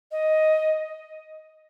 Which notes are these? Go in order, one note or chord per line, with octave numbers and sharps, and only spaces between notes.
D#5